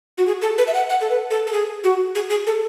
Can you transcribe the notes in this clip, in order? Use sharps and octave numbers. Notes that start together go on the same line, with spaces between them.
F#4
G#4
A4
B4
E5
F#5
F#5
A4
B4
A4
A4
G#4
F#4
G#4
G#4
A4